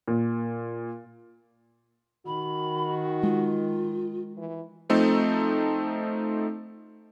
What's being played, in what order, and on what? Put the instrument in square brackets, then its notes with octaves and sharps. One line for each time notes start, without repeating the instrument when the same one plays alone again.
[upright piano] A#2
[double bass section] D#3 [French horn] F#4 [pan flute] B5
[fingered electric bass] G#3 [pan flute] F4
[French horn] E3
[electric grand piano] F3 A3 C4 D#4 A4